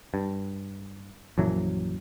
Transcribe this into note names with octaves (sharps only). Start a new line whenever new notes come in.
G2
A#1 F#2 E3 F#3